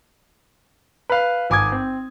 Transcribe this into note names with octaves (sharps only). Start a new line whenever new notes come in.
B4 F5
G#1 G#5 D6 D#6 G#6
C4